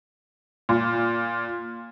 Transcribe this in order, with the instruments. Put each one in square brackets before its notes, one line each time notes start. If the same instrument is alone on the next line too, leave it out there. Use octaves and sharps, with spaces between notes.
[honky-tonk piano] A#2